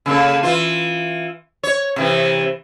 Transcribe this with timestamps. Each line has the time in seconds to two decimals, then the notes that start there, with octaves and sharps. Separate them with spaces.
0.06 C#3 A#3 A4
0.43 E3 F4
1.63 C#5
1.96 C3 E3